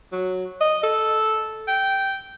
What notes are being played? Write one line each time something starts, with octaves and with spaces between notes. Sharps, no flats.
F#3
D#5
A4
G5